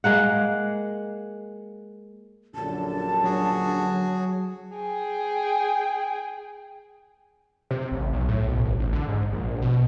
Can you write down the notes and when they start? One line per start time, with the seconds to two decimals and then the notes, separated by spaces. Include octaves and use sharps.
0.04 G#3 A#3 F#5
2.55 A#1 F#2 D3 A5
3.24 F#3 F#4 G#4
4.75 G#4 G5
7.71 C3
7.92 A1
8.13 B1
8.28 A2
8.47 B1
8.65 G#1
8.79 A1
8.93 D3
9.07 G#2
9.32 A#1
9.62 B2